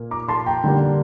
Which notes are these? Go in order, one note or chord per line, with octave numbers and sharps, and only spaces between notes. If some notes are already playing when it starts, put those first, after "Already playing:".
Already playing: A#2 A#3
A#5 D6
A5 C6
G5 A#5
D3 G3 A#3 D4